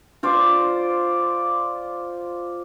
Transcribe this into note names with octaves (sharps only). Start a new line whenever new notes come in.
F4 C5 D5